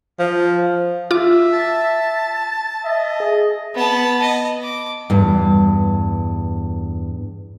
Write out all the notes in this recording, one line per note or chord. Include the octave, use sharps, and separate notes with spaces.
F3
F4 E5 D6
A5
D#5 E5
G#4
B3 A5
D#5
D6
E2 G2